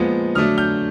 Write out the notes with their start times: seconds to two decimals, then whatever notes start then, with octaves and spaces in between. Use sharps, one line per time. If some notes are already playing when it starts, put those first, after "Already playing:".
Already playing: A#2 F3 G#3 B3
0.35 D3 F#3 A3 D4 D#6 F6
0.58 F6 G6